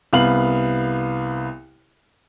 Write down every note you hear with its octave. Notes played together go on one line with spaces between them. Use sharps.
C2 B3 F5 F#7